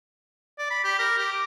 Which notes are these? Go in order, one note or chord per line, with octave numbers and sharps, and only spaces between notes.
D5
B5
G4
A#4
G4
D6